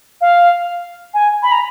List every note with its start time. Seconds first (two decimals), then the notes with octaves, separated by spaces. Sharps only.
0.21 F5
1.14 G#5
1.43 B5
1.52 A#5